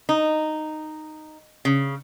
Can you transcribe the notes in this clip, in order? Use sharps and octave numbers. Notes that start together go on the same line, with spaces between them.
D#4
C#3